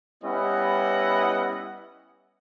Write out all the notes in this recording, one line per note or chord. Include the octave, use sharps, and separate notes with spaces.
G3 B3 C#4 E4 D#5 F#5